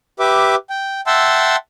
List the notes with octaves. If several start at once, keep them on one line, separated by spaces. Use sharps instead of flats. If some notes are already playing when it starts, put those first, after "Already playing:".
G4 B4 E5 D6
G5
E5 F#5 G5 A5 C6 E6